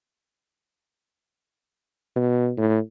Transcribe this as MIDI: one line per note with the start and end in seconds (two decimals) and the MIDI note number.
2.16 2.51 47
2.57 2.78 45